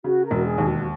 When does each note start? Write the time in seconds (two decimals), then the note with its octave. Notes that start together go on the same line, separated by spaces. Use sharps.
0.04 C#3 F#4
0.24 A#4
0.31 E1 F#4
0.44 G#4
0.58 D#2
0.64 F#4